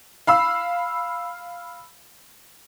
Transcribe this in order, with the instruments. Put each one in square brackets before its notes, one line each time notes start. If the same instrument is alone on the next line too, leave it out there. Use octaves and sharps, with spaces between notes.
[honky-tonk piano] F5 B5 E6